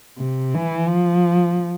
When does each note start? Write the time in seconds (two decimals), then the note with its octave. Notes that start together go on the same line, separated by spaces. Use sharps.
0.19 C3
0.55 E3
0.89 F3